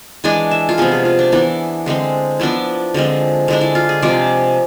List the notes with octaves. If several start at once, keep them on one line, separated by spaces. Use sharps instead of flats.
E3 G#3 D4 G#5
E5
F4
C3 F3 B3 G#4
G#4
F4
D4
E3 B3 D4 E4
D3 G#3 C4
F3 B3 D4 E4
D3 F3 G#3 C4
D3 G#3 D4 E4
E4
F4
G#4
C3 F3 G#3 D5